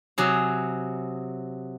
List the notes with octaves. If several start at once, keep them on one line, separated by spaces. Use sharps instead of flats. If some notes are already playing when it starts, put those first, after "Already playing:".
C3 F#3 G#4